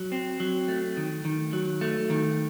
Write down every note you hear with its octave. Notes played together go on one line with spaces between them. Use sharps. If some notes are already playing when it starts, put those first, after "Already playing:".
Already playing: F#3
C4
F#3
A3
D#3
D#3
F#3
A3
D#3